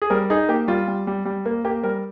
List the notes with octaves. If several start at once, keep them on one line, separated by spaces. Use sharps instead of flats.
G#4
G3 A#4
D#4 G#4
A#3 G4
G3 F4
G3
G3
G3
A#3
A#3 G4
G3 A#4